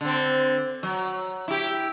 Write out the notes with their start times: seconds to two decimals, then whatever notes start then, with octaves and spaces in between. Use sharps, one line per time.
0.01 D3 C4
0.83 F#3
1.48 E4 G4